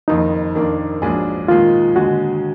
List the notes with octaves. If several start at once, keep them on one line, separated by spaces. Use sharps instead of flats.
F#1 F2 D#3 D#4
F2 D#3 A#3 D4
A#1 G#2 F#3 D4 G#4
D#2 D#3 G#3 D#4 F4
D#2 D3 G#3 F#4